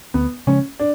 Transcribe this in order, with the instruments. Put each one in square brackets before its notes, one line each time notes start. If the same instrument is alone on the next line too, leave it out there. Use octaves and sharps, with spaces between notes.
[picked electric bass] D2 [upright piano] B3
[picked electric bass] C#3 F3 G#3 [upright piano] C#4
[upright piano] D4